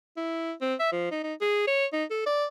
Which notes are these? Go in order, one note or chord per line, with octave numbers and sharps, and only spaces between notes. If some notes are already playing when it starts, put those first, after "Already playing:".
E4
C4
E5
F3
D#4
D#4
G#4
C#5
D#4
A4
D5